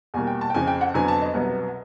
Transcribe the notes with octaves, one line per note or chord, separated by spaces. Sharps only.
E2 B2 G3 A#3 G#5
G5
A5
G5
F2 C#3 F3 G#5
G5
F#5
F2 D3 F#3 B3 G#5
A5
D#5
C2 B2 F#3 B3